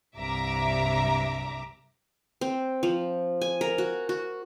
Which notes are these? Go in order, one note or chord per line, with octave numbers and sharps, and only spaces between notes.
C2 G2 E5 A#5 D6
C4
F3
G#5
A#4
F#4
F#4